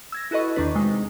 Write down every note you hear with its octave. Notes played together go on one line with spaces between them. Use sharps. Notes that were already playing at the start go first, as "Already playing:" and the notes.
E6 G#6 A#6
E4 F#4 A4 B4 D#5 C#6
E2 D#3 D4 B4
C3 G#3 D#4